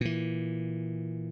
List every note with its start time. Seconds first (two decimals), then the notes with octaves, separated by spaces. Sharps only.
0.01 A#2 E3